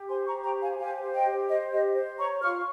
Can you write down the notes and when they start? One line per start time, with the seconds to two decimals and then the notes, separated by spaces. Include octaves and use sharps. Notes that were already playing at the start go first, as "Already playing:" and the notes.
Already playing: G4
0.09 C5 G#5 C6
0.26 A#5 C#6
0.32 G4
0.44 G5 A#5
0.55 C5
0.61 F5 G#5
0.79 G4 F5 G#5
1.02 C5
1.14 D#5 G5
1.25 G4
1.49 C5 D#5
1.72 G4 D#5
1.95 C5
2.19 C#5 A#5 C#6
2.41 F4 C#6 F6